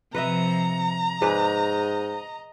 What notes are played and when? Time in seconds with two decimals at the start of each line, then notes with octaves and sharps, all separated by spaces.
0.15 C3 F3 B4 D#5 E5 A#5
1.22 G#2 G#4 B4 D5 D#5